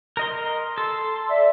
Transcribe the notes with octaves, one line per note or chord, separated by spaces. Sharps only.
A#4 D#5 C6
A4 C6
D5 E5